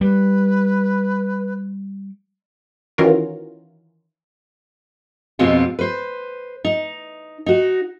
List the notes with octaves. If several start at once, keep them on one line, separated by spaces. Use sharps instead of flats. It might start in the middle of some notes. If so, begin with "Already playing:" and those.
G3 B4
D#3 E3 C#4 F4 F#4 A#4
F2 B2 G#3 B3 C4 F4
B4 C5
D#4
D#4 F#4